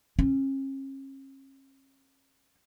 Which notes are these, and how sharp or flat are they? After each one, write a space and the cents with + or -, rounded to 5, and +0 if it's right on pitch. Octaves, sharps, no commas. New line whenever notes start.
C#4 -40